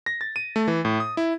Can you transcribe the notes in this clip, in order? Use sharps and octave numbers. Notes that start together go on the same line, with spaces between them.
A#6
A6
D#7
A3
E3
A2
D#6
E4